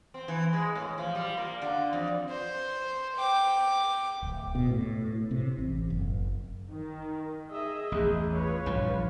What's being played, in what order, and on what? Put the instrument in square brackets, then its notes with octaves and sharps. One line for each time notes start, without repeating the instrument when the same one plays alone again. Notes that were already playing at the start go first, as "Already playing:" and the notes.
[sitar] C4
E3
G#3
A2
F3
G3
A#3
D3
F2
[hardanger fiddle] C5
G5 D6
[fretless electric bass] D1
B2
A2
C3
A1
F#1
[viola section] D#3
G#4 D#5 E5
[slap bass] A1 E2 [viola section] G#4
[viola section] F4 B4 C#5
[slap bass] A#1 G2 F3